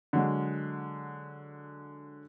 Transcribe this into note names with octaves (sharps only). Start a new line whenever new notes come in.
D3 F#3 G#3